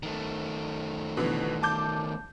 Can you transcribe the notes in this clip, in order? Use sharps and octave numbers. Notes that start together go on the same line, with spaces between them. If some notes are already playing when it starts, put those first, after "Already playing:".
D#3 A3
B2 D3 E3
A5 D6 G6